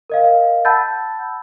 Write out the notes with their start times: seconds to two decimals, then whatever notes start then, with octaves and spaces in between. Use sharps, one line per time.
0.10 A#4 D#5 F5
0.65 F#5 A5 B5 E6 G6 A6